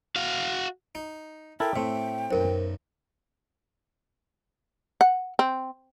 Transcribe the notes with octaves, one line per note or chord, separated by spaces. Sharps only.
F#4 F5
D#4
E4 A4 A#4 G5
A2 A3 C4 E5
B1 F#2 A#4 C5
F#5
C4